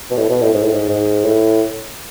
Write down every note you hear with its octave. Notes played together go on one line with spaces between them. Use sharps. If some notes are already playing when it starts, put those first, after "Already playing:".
B2
A2
B2
A2
G#2
A2
G#2
G#2
A2